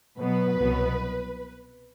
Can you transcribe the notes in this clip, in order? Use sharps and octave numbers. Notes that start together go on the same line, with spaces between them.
B2 F#3 B3 B4
C2 B2 F#3 B3